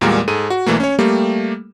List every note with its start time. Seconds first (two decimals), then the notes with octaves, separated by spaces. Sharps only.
0.01 E2 A#2 G3 G#3 A#3 A#4
0.28 G#2 G#4 A4 D#7
0.50 F#4
0.66 B1 E3 A3 A#3
0.80 C#4 C#5
0.99 G3 A3 A#3 G4